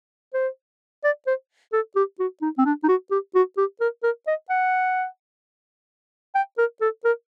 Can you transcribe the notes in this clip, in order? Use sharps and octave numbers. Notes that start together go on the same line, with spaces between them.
C5
D5
C5
A4
G4
F#4
D#4
C4
D4
D#4
F#4
G4
F#4
G4
A#4
A#4
D#5
F#5
G5
A#4
A4
A#4